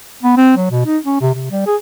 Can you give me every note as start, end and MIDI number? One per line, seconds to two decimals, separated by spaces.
0.23 0.35 59
0.37 0.55 60
0.57 0.70 54
0.71 0.85 47
0.86 0.98 63
1.05 1.18 61
1.21 1.32 48
1.34 1.46 48
1.51 1.62 55
1.66 1.76 68